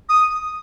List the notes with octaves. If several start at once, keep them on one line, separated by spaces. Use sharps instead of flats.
D#6